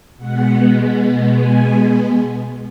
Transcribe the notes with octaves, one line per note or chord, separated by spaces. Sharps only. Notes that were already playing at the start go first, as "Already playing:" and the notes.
B2 G#3 B3 F#5
G#5